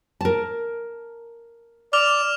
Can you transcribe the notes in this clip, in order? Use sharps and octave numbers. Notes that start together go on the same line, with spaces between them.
A#4 A5
D5 D6 F6 F7